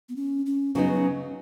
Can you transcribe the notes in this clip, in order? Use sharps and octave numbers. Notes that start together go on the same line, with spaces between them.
B3
C#4
C#4
C#3 F#3 B3 C#4 D#4